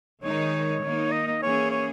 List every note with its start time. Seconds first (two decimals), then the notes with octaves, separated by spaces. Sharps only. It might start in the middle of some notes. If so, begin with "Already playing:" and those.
0.23 D#3 G#3 D#4 C#5
0.82 D#3 A#3 D#4
1.12 D#5
1.27 D#5
1.42 E3 A#3 C#4 G#4 C#5
1.71 C#5